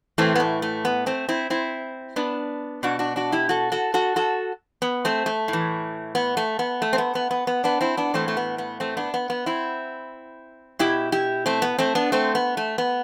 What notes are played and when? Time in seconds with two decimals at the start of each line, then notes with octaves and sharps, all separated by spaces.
0.18 A2 E3 A3 C4
0.35 B3
0.40 A3
0.62 A3
0.85 B3
1.06 A3 C4
1.29 C4 E4
1.50 C4 E4
2.16 B3 D4
2.83 B2 D4 F#4
2.99 D4 F#4
3.16 D4 F#4
3.32 E4 G4
3.49 F#4 A4
3.72 F#4 A4
3.94 F#4 A4
4.16 F#4 A4
4.82 B3
5.05 A3 C4
5.26 A3
5.48 A2
5.53 E3
6.15 B3
6.37 A3
6.59 B3
6.82 A3
6.93 C4
6.98 B3
7.15 B3
7.31 B3
7.47 B3
7.64 B3 D4
7.81 C4 E4
7.97 B3 D4
8.14 A2 E3 A3 C4
8.28 A3
8.37 B3
8.58 B3
8.80 A3 C4
8.97 B3 D4
9.14 B3
9.30 B3
9.46 C4 E4
10.79 B2 E4 G4
11.12 E4 G4
11.46 A3 C4
11.62 B3
11.79 A3 C4
11.95 B3 D4
12.12 A3 C4
12.35 B3
12.57 A3
12.78 B3